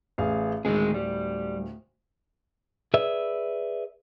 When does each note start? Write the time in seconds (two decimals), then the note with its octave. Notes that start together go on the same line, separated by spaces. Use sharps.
0.18 A1 G#4 F5
0.65 D1 D#3 G#3 G#4
0.94 G3
2.94 G#4 B4 D5 E5